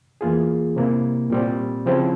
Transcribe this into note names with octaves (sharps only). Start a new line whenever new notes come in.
E2 E3 A#3 F4 G#4
C3 G3 A#3 E4
A#2 G3 C4
C#3 F3 C4 E4